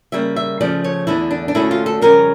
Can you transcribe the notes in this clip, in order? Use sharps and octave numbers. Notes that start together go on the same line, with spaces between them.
C#3 G3 A#3 E5
E5
C#3 F3 A3 D5
C#5
E2 D3 A3 D4 E4
D4
D4
D2 D3 A3 C#4 E4
F4
A4
F2 C#3 G3 C#4 A#4